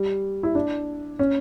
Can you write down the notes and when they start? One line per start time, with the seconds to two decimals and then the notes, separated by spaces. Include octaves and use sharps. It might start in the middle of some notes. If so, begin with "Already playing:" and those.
Already playing: G3
0.43 E4
0.55 D4
1.19 C#4